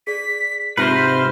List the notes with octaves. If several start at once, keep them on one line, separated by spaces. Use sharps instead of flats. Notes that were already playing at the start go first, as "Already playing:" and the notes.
G#4 D5 B6
G#2 C3 F4 B4 C5 F6 A#6